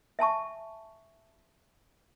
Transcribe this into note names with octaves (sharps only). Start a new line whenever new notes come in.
E5 G#5 A5 C#6